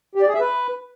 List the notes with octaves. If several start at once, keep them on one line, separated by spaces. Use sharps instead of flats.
G4
D5
G#4
E5
B4